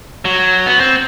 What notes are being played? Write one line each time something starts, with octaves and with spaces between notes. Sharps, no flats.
F#3
B3
C4